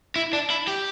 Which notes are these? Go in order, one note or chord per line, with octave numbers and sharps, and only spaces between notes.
E4
D4
E4
G4